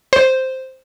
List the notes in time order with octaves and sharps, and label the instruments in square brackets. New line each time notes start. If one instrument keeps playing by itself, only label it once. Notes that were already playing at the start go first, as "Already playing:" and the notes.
[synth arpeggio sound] C5